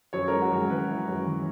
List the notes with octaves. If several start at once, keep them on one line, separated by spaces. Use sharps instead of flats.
F#2 C#5
G#3 A#4
F#4
F#2 G#4
E3 B4
E3
F#2
E3